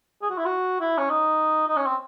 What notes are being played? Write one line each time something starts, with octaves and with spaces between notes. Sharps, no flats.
G#4
F#4
E4
F#4
E4
C#4
D#4
D#4
C#4
C4